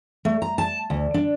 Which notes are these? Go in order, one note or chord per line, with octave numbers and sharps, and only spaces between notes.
A3
A#5
A5
D2
D4